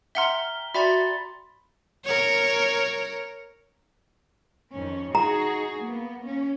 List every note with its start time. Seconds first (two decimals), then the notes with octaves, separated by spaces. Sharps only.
0.15 E5 F#5 G5 A#5 C6 F6 B6 G7
0.74 F#4 D5 E5 G5 B5 C6 A6
2.06 A#4 C#5
4.72 F2 D#3 C#4
5.15 D#4 F#4 G#4 A#5
5.81 A#3 B3
6.25 C#4